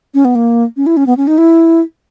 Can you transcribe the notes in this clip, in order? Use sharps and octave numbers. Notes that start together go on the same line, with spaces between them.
C#4
B3
A#3
C#4
E4
C#4
B3
C#4
D#4
E4